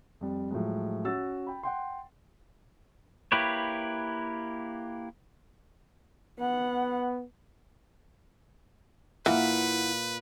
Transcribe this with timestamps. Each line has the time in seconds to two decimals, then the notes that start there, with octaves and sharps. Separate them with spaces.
0.21 F2 G3
0.51 A2 F3 F#3 G#3
1.05 C#4 F#4 E6 A6
1.47 G5 B5
1.63 F#5 G5 C6
3.32 A#3 E4 G4 B4 C#5
6.39 B3 F#5
9.26 A#2 E3 E4 F4 B4 F#5